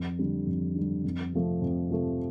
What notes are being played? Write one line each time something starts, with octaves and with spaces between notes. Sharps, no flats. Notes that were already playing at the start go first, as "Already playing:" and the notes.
Already playing: F2
D3 G3
F2
D3 G3
F2
C3 F3 A3
F2
C3 F3 A3